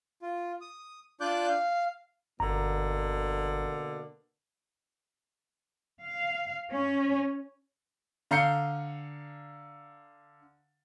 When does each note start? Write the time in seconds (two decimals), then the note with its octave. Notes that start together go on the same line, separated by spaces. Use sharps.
0.22 F4
0.61 D#6
1.20 D4 F4 D5 D6 F#6 G6
1.48 F5
2.40 G1 B2 D3 A#3 A#5
6.03 F5
6.71 C#4
8.31 D3 F5 A#5 G6 C7 C#7